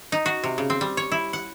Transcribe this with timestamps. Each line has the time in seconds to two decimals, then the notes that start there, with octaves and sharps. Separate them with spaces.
0.12 D#4
0.26 F#4
0.44 C3
0.58 C#3
0.70 C4
0.81 G3
0.97 C#5
1.12 E4
1.33 F#5